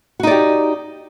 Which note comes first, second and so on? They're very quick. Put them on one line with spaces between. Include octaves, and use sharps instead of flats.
F#4 D#4 D5 G4